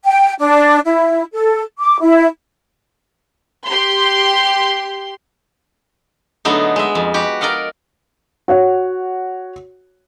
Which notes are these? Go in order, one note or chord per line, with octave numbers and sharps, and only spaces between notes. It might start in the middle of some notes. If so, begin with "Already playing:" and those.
G5
D4
E4
A4
D6
E4
G4 C6
D3 F#3 A3 B3 D#4
G#3 E5
F2
F#4 G4 B4
A#4 D5 D#5 F5 F#5
F#4 C#5 F#5